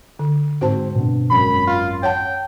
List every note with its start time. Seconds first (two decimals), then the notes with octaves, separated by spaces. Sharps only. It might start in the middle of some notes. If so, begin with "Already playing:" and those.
0.19 D3
0.61 G#2 C4 F#4 C5 A5
0.95 G2 B2
1.31 G#1 F#2 A#4 B5
1.67 F4
2.03 C#5 F#5 G5 A5